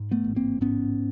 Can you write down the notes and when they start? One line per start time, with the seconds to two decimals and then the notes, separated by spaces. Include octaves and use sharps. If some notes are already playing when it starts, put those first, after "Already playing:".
Already playing: G#2
0.11 A3 B3
0.24 A1
0.36 A#3 C4
0.61 G#2 B3 C#4